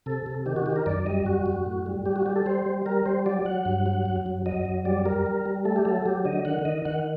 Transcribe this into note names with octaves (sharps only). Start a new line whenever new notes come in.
C3 A4
C3
D#3 G4
F#4
D#3 G4
A#4
F#2 D5
G3 D#5
F#2 F#4
F#2
A2
G3
G3 G4
F#4
G3 G4
A4
G3 C5
G3
G3 A#4
G3 C5
F#3 D5
F#3 F#5
G2
F#3
F#2
F#3
F#3 D#5
F#2
G3 D5
G3 A#4
G3
G3
A3 A4
G4
F#3 A4
A4
F#3 G4
D3 D#5
D#3 F#5
D#3 D#5
D#3 F#5